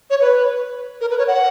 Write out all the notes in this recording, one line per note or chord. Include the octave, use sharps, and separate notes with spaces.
C#5
B4
A#4
B4
C#5
F#5